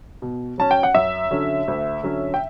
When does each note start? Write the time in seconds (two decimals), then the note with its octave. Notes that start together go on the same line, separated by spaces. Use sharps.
0.22 B2
0.58 F#3 C#4 A5
0.71 G5
0.83 F#5
0.94 F#2 E5
1.31 D3 F#3 C#4
1.68 D2
2.03 D3 F#3 C#4
2.34 G5